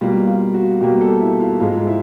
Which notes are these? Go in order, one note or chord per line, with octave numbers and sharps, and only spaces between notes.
B2 G3 A#3 F4
F4
F#4
B2 G3 A#3 G4
A4
E4
F4
G#2 F3 G#3 F4
E4